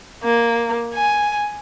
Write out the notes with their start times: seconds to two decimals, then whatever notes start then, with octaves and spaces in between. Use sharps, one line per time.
0.24 A#3
0.94 G#5